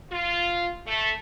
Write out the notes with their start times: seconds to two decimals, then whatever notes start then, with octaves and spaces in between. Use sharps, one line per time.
0.11 F4
0.86 A3